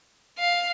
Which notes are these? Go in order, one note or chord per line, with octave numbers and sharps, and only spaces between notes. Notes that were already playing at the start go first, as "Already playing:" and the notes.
F5